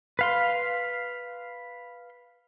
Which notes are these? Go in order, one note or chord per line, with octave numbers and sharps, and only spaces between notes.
B4 F5 C6